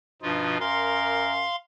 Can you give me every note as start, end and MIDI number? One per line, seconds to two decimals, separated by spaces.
0.22 0.55 43
0.22 0.58 47
0.22 0.58 53
0.22 0.58 63
0.22 0.58 65
0.60 1.46 42
0.60 1.32 70
0.60 1.56 77
0.60 1.56 84